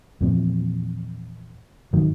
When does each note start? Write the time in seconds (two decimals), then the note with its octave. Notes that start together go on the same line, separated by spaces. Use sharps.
0.21 E2 A#2 F3 C4
1.93 G#2 D#3 F#3